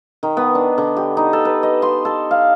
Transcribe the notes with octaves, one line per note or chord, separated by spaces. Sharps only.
D#3
B3
D4
D3
G4
D#4
A4
B4
D#5
C6
A4
F5